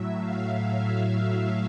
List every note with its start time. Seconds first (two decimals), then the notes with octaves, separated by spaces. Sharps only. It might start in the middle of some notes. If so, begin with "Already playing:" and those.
Already playing: A2 F#3 E5
0.16 F5